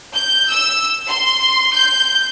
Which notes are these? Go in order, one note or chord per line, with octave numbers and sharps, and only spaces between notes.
G6
E6
C6
G6